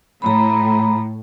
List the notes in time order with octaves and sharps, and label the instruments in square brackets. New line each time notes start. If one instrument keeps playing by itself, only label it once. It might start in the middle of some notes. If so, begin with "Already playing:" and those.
[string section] A2 [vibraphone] A#5 B5